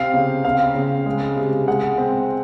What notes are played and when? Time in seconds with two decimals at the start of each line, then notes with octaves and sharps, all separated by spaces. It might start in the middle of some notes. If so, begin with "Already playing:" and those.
Already playing: C3 C4 F5
0.14 C#3
0.45 C4 F5
0.75 C#3
1.06 G#3
1.36 C3
1.67 G#3 F#5
1.98 C4